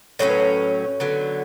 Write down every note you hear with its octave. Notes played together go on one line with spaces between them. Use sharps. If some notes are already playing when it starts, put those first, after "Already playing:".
A2 F#3 A3 C#4 C#5
B4
C#5
D3 F#3 B3